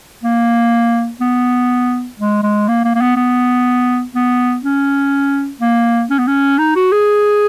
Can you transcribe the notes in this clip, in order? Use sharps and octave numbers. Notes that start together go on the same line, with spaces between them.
A#3
B3
G#3
G#3
A#3
A#3
A#3
B3
B3
B3
C#4
A#3
C#4
B3
C#4
D#4
F#4
G#4